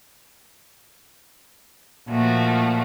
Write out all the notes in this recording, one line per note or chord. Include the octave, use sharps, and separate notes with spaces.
A#2 F3 A3 F#4